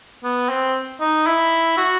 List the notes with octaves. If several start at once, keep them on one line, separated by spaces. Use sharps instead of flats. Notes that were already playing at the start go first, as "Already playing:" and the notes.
B3
C4
D#4
E4
F#4